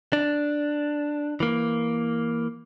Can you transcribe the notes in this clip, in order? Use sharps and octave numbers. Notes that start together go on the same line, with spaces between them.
D4
E3 A#3